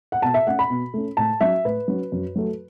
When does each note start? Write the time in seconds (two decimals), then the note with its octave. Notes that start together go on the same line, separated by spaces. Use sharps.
0.12 F#5
0.22 B2 A5
0.34 E5
0.47 A3 C#4 F#5
0.59 B5
0.70 B2
0.94 A3 C#4
1.17 A2 A5
1.41 F#3 C#4 E5
1.64 A2 B4
1.88 F#3 C#4
2.12 F#2
2.35 F#3 A3